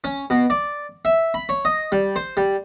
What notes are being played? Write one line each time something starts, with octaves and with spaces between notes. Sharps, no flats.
C#4
B2
D5
E5
B5
C#5
D#5
G3
C5
G3